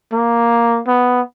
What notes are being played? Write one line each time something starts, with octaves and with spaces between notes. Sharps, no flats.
A#3
B3